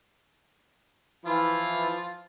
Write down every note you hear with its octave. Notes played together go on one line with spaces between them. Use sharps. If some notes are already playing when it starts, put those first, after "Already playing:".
E3 F3 E4 F4